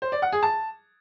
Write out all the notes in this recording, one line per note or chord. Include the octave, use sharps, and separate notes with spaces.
C5
D5
F#5
G#4
A5